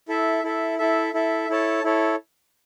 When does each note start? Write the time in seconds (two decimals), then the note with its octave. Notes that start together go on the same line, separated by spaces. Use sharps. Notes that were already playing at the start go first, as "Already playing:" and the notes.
0.08 E4 A4 E5
0.44 E4 A4 E5
0.78 E4 A4 E5
1.14 E4 A4 E5
1.49 E4 A4 C#5 A5
1.84 E4 A4 C#5